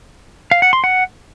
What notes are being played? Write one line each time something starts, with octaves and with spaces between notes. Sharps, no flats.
F5
F#5
C6
F#5